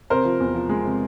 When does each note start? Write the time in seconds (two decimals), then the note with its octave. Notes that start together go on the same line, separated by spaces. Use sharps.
0.10 C3 A#4 C5
0.25 F3
0.40 E2
0.55 F3
0.69 G#3
0.84 C3